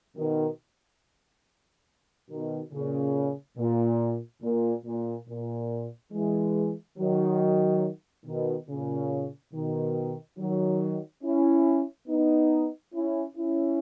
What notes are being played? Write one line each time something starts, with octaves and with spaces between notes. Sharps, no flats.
B2 D#3
B2 D#3
A#2 C#3
A#2
A#2
A#2
A#2
E3 G#3
D#3 F#3
B2 D#3
A#2 C#3
B2 D#3
D#3 F#3
C#4 E4
B3 D#4
C#4 E4
C#4 E4